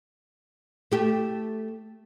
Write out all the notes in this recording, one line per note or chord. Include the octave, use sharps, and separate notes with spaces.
A3 G4